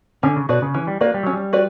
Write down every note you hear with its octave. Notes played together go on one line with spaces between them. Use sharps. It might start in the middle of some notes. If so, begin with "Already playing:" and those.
D3 C#4
C#3
B2 F#4 B4 D5
C#3
E3 C#4
G3
A#3 F#4 B4 D5
G3
F#3 C#4
G3
F#4 B4 D5